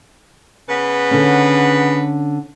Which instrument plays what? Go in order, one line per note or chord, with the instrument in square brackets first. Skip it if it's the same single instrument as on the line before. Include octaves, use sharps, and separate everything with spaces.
[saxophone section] C#3 B3 B4
[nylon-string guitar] D3 C#4